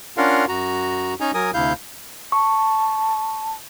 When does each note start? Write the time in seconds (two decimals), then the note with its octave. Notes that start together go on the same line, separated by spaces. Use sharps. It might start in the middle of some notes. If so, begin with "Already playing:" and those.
0.17 C#4 D4 F4 A#4 F5 F#5
0.49 F#2 F#4 A#5
1.21 C#4 D#4 D#5 G#5 A#5
1.34 F#3 A#4 G#5 D#6
1.54 D2 C3 E4 F5 G6
2.32 A5 C#6